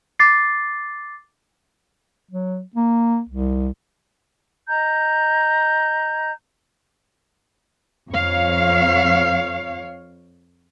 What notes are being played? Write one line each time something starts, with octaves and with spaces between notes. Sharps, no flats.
D6 A6 C7
F#3
A#3
C2
D#5 A#5 G6
F2 C#5 F5